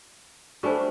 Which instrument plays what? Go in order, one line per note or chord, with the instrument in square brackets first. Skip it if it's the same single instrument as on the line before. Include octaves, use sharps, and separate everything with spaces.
[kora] G3 A3 D4 [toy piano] C5 G#5 C#6